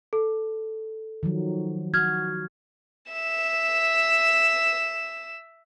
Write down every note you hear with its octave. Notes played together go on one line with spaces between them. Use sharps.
A4
D#3 F3 F#3
F#4 F6 G#6
E5 E7